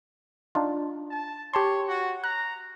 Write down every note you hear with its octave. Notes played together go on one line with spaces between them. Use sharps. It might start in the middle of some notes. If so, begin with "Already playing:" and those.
D4 D#4 F4
A5
G4 C#5 A5 C6
F#4
A#5 F#6